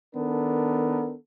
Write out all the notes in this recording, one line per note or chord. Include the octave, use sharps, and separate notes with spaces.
D#3 B3 D4 A4 A#4